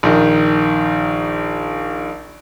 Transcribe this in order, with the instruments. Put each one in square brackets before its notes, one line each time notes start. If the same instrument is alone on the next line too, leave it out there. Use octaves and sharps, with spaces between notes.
[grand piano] A#1 D#3